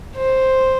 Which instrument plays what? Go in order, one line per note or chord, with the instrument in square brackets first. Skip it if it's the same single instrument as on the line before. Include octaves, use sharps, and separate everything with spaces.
[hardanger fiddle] C5